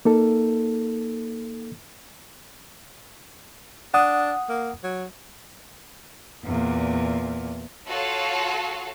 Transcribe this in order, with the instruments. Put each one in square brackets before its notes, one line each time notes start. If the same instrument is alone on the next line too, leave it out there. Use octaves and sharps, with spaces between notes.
[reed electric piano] A#3 D#4 A4
[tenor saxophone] D4 [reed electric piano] F#5 D#6
[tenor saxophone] A#3
F#3
[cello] E2 A#2
[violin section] F4 F#4 A4 C#5 F5